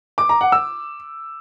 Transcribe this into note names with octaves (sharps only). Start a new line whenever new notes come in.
D6
A#5
F#5
E6